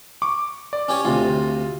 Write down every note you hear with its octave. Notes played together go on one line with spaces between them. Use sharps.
C#6 D6
D5
C#4 G4 C#5
D2 C3 F4